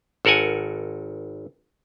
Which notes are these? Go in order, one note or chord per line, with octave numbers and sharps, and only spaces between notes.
G#1 A4 A#4 F#5 G#5